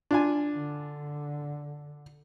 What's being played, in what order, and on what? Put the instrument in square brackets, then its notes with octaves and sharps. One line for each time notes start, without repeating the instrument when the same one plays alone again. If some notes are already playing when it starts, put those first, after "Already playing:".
[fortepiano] D4 F4 G#5
[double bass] D3